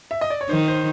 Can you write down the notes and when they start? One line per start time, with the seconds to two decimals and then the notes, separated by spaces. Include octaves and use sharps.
0.11 E5
0.21 D#5
0.30 D5
0.41 C#5
0.49 D#3 C5
0.68 C5